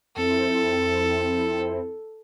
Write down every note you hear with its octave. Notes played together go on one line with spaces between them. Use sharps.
F2 C4 E4 A4